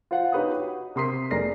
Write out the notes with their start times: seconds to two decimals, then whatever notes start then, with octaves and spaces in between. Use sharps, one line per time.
0.11 F4 C5 F5 F#5
0.32 D#4 F#4 G4 B4 C#5 D#6
0.57 F#4
0.96 C3 A#4 C6 D#6 B6 C7
1.31 F1 G#4 A#4 D5 A#6 C7